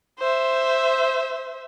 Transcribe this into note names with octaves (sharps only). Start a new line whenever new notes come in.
C5 E5